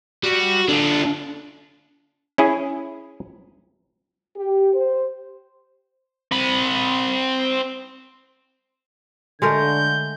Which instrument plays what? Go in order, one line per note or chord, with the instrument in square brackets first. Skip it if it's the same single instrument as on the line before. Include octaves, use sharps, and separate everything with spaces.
[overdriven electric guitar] G3 [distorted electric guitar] F#4
[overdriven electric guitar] D3 [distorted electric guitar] D4 F4
[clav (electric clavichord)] C#4 E4 G#4
[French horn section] G4
C5
[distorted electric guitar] C4 B5
[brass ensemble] D3 [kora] G#3 A3 A#4 [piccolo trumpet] G6